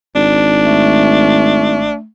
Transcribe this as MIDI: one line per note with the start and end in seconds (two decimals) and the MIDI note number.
0.15 1.92 32
0.15 1.95 62
0.64 2.07 57